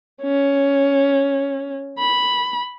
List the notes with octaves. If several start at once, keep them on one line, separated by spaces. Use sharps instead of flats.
C#4
B5